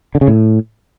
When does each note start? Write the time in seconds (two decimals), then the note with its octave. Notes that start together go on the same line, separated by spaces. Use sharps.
0.15 D3
0.21 C#3
0.28 A2